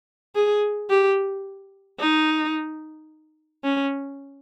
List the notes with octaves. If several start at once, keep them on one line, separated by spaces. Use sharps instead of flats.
G#4
G4
D#4
C#4